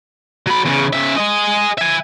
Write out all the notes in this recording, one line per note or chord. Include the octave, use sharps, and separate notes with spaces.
F#3 B5
E2 C#3
C#3 E5
G#4 D#5
E5 G#5